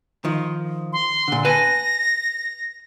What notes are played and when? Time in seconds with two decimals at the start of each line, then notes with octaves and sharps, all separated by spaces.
0.25 D#3 F3
0.93 C6
1.28 A#2 D3
1.45 B4 G#5 A5 A#6